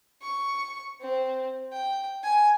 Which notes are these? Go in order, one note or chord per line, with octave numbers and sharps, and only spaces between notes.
C#6
C4
G5
G#5